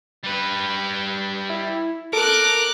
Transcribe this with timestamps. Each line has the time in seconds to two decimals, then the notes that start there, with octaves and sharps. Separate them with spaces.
0.24 G3 B4
1.50 E4
2.13 A4 A#4 D6 F#6